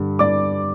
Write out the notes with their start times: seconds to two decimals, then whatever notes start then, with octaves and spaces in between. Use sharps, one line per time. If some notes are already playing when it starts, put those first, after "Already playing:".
Already playing: G2 D3 G3
0.19 G2 D5 D6